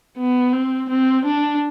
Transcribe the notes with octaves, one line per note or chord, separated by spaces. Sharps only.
B3
C4
C4
D4